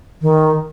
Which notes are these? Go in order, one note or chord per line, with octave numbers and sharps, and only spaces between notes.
D#3